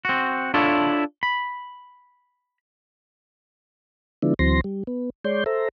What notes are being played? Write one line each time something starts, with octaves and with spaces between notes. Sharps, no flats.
C4 F#4
D4 E4 F4 A4 C#5
B5
D3 F3 G#3 B3 D4 E4
D2 E3 F#3 C4 C6 A#6
G3
B3
G#3 C#5 D5 C6 G6
A4 C5 E5 A#5